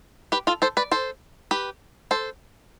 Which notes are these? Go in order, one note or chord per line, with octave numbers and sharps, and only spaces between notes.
G4 B4
F4 A4
A4 C5
B4 D5
A4 C5
G4 B4
A4 C5